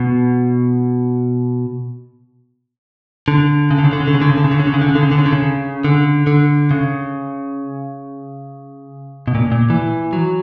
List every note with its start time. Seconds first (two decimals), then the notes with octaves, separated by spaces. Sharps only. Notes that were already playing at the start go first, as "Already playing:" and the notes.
Already playing: B2
3.28 D3
3.71 C#3
3.79 D3
3.85 C#3
3.93 D3
4.01 C#3
4.08 D3
4.14 C#3
4.22 D3
4.30 C#3
4.38 D3
4.44 C#3
4.51 D3
4.60 C#3
4.67 D3
4.74 C#3
4.81 D3
4.89 C#3
4.95 D3
5.03 C#3
5.11 D3
5.18 C#3
5.26 D3
5.32 C#3
5.84 D3
6.27 D3
6.71 C#3
9.28 B2
9.35 A#2
9.52 A#2
9.70 E3
10.13 F#3